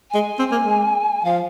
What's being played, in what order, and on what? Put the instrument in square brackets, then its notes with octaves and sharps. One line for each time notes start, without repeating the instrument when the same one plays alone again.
[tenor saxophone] G#3 [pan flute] G#5
[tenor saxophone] C4
A#3
G#3
[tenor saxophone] F3 [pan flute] F5